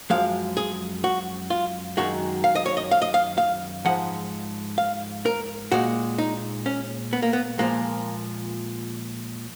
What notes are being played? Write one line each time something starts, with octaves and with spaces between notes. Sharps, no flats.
F#2 F3 G#3 F5
G#4
F#4
F4
F#2 D#3 G#3 F#4
F5
D#5
C#5
D#5
F5
D#5
F5
F5
G#2 F3 G#3 F#5
F5
A#4
A#2 G#3 F#4
D#4
C#4
B3
A#3
B3
A#2 F3 G#3 A#3